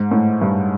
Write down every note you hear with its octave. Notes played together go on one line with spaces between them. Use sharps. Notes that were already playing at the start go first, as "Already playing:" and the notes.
Already playing: G#2
A2
G2